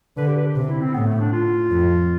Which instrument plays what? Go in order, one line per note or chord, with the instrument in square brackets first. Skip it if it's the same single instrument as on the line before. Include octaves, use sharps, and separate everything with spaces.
[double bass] D3 [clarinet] B4
[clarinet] G4
B4
G4
[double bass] C3
[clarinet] E4
C4
[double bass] A2 [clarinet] B3
[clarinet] A3
D4
F4
[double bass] F2